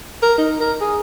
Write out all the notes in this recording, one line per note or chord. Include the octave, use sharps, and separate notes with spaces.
A#4
D#4
A#4
G#4